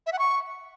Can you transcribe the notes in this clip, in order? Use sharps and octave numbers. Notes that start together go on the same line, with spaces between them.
E5
F#5
C#6